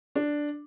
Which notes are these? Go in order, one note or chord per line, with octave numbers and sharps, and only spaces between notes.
D4